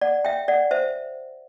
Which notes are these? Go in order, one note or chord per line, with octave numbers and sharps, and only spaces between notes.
D5 F#5
E5 G5
D5 F#5
C5 E5